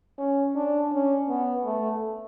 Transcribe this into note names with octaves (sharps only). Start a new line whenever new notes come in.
C#4
D4
C#4
B3
A3